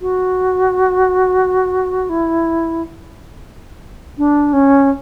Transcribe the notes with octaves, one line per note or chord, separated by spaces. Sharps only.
F#4
E4
D4
C#4